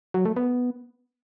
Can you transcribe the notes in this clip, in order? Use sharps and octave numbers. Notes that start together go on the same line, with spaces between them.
F#3
A3
B3